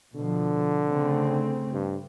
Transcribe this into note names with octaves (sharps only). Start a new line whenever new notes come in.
B2 D3 F3
C#3 A3 C4
G2